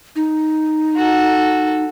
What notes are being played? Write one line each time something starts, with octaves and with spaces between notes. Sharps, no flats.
D#4
F#4 A4